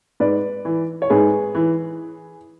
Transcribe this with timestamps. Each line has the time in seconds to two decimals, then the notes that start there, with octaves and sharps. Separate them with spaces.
0.20 G#2 B4 D5
0.65 E3
1.02 C#5
1.10 G#2 G#4 B4
1.55 E3